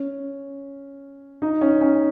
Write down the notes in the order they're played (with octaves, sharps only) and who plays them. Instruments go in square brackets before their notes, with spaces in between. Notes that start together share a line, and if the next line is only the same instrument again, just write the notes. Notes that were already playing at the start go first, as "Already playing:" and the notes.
Already playing: [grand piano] C#4
D#4
C#4
C#4